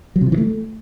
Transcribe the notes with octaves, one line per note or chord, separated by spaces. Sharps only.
F#3
C3
F3
E3
A3